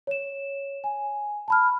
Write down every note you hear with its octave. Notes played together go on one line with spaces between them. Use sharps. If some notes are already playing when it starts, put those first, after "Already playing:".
C#5 E7
G#5
A5 B5 F6